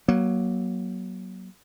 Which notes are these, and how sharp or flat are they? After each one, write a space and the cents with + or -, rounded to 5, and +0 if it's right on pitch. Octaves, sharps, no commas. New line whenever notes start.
F#3 +15 A#3 +30